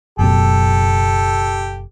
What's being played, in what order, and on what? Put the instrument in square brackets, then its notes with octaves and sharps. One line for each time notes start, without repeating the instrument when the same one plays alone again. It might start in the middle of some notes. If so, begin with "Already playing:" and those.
[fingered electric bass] F#1 F#2 B2 [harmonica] G4 A4